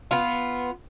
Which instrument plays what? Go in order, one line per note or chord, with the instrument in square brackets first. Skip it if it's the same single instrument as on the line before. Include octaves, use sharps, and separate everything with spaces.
[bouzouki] B3 F4